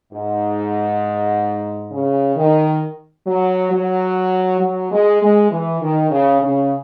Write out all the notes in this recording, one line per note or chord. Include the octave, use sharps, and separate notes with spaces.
G#2
C#3
D#3
F#3
F#3
F#3
G#3
G#3
E3
D#3
C#3
C#3